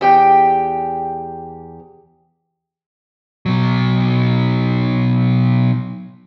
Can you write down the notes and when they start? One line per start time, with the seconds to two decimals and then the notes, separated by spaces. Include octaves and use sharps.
0.01 E2 G4 G5
3.46 B2 F#3